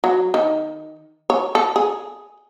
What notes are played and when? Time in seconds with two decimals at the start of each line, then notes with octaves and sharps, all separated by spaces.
0.04 F#3
0.34 D#3
1.30 C#5
1.55 A4
1.76 G#4